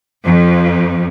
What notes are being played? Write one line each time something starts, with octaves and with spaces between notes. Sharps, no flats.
F2